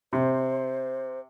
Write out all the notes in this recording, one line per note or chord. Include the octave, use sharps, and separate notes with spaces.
C3 C5